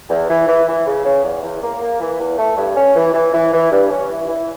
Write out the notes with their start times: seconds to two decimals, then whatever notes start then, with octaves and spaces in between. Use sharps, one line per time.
0.09 E2
0.29 E3
0.47 E3
0.67 E3
0.87 C#3
1.05 C#3
1.24 E2
1.44 E2
1.62 A#3
1.82 A#3
2.00 E3
2.20 E2
2.38 A3
2.57 G2
2.76 C#4
2.96 E3
3.14 E3
3.33 E3
3.53 E3
3.71 G2
3.90 C#4
4.10 E3
4.28 E3